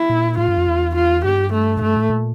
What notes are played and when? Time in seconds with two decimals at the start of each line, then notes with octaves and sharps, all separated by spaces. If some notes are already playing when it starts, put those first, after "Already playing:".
Already playing: E4
0.09 A#2
0.38 A2 F4
0.48 G2
0.58 F2
0.67 E2
0.95 F4
1.24 G2 G4
1.53 A3
1.77 A2
1.81 G2 A3
1.97 A2
2.10 A#2